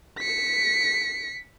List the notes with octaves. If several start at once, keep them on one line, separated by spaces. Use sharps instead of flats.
B6 C#7